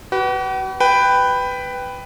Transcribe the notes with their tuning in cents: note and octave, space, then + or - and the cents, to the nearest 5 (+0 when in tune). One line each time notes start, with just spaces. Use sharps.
F#4 +45 B4 +0
B4 +10 G5 +0